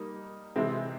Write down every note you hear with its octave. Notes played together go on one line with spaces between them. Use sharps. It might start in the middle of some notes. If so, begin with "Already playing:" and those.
Already playing: G3 A#3 D#4
C3 E3 G#3 C4